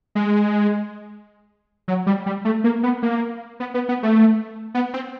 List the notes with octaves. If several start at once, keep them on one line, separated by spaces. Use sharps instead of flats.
G#3
F#3
G3
G3
A3
A#3
B3
A#3
B3
B3
B3
A3
B3
C4